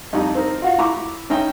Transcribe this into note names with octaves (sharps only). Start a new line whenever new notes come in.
F2 G3 D#4
C4 D#4 A#4
F4 F#4 F5
E4 A#5 C#6 D6
C#4 D#4 E5 G5